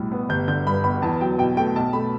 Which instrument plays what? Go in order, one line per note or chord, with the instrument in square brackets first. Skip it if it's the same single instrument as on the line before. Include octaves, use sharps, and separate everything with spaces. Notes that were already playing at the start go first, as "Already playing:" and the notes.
Already playing: [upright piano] B1 A2 G3
B3
G1 G6
D3 G6
G2 B5
G1 B5
E2 A5
F#3 G5
B2 G5
A3 G5
B1 A5
A3 B5